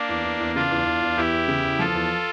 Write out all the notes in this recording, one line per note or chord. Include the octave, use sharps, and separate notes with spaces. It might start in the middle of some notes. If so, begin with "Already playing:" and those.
Already playing: A#3 D4
E2
E2
E2
C#3 D4 F4
E2
E2
E2
E2 E4 G4
E2
C#3
E2
F3 F4 A4
E2